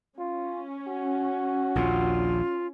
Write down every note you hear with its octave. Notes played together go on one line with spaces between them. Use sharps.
C#4 F4
F#4
A#1 D#2 A#2 F4